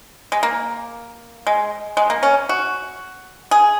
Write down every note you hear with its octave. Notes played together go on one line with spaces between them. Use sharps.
G#3
A#3
G#3
G#3
A#3
C#4
F#4
G#4